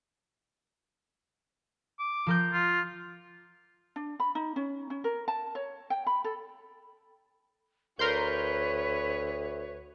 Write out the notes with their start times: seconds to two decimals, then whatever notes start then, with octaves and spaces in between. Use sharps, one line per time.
1.99 D6
2.26 F3 A#4 G6
2.53 F4
3.96 D4
4.20 B5
4.35 D#4
4.56 C#4
4.90 C#4
5.04 A#4
5.28 A5
5.55 C#5
5.90 G5
6.07 B5
6.24 A4
7.99 D2 A#4 B4 C#5 C6 G6